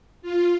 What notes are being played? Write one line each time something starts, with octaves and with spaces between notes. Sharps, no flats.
F4